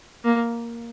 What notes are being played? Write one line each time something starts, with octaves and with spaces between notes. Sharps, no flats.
A#3